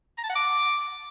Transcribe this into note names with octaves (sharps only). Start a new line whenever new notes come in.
A#5
A5
F#5
D6